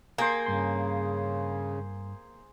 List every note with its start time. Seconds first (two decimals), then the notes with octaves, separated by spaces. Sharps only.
0.18 A#3 G#4 C5
0.46 G2 C#3 C6